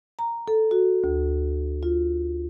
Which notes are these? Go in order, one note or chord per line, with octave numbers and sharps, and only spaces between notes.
A#5
A4
F#4
D2
F4